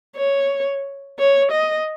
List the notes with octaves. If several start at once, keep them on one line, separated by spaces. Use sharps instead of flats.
C#5
C#5
D#5